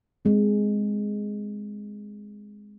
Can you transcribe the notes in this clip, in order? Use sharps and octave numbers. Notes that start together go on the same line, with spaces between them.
G#3 C4